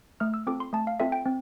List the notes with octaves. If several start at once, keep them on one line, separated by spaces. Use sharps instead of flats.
A3 F6
E6
C4 F4 A4 D6
C6
A3 A5
F5
C4 F4 A4 E5
G5
C4